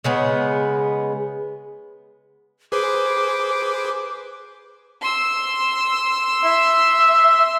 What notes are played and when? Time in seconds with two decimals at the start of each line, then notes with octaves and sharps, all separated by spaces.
0.04 C#3 G#3 B3
2.72 G#4 B4 C5 D6
5.01 C6 E6
6.44 E5